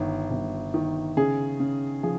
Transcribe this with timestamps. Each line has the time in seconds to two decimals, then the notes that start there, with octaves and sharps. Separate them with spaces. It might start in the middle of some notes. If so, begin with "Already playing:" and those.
Already playing: G1 D#3
0.30 G1
0.74 D#3
1.17 C#3 G#4
1.60 C#3
2.03 F3 G#4